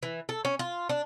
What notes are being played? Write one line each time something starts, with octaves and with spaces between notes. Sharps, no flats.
E3
A4
C#4
F4
D4